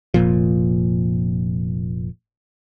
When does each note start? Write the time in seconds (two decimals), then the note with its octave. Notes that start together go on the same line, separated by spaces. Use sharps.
0.14 F1 C#2 A#2 F3